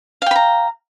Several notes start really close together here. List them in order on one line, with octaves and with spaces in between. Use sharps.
F5 G5 B5 A#5